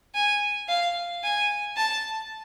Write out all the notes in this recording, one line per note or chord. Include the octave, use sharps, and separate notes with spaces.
G#5
F5
G#5
A5